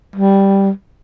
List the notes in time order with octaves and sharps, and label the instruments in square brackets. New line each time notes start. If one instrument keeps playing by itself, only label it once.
[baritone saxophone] G3